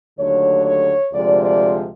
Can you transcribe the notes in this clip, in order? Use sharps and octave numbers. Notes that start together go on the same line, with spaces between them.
D#2 D3 F#3 A3 C#5
C#5
D2 C3 F3 G#3 D5
D5